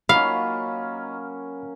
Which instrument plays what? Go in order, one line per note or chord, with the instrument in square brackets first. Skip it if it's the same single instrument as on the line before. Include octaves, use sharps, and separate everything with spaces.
[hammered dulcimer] F#3 A#3 C#4 [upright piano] D#4 F4 [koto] F5 [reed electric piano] B5